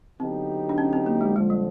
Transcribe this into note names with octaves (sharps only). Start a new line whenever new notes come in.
D3 F#3 B3 C4 D#4 G4
D4
C#4
C4
A#3
G#3
F2 D3 F3 G#3
G3